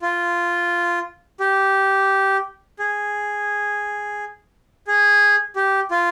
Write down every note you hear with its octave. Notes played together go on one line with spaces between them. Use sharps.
F4
G4
G#4
G#4
G4
F4